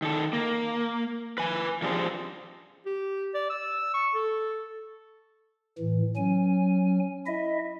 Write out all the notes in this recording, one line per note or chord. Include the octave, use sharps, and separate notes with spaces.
D#3 A4
A#3
B4 G#5
F3 G3 C4 D4 G#4 C5
G4
D5
E6
C#6
A4
A2 E3
F#3 C#4 G#5
E4 D#5 E5